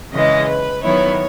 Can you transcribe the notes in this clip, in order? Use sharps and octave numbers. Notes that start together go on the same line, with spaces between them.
C#3 E3 G#3 D#5
B4
D#3 F#3 B3 E4 C#5